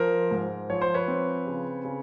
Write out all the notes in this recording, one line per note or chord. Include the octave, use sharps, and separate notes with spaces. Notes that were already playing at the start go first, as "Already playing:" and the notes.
Already playing: F3 A#4 C5
G#2
F3 C#5
C5
B4 C#5
C4
C#3
C#3